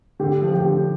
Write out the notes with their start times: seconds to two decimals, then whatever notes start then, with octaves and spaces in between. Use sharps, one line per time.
0.19 D3 G4
0.42 F3
0.54 G4
0.64 D3